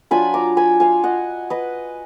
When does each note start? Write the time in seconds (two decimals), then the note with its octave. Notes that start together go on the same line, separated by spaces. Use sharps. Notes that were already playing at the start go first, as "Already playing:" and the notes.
0.11 F#3 D4 F4 G#5 B5
0.34 A#5 D6
0.57 G#5 B5
0.80 F5 G#5
1.04 D#5 F#5
1.50 B4 D#5